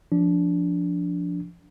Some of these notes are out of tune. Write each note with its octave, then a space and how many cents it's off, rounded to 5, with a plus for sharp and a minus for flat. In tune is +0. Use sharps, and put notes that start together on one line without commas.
F3 +0 D4 -20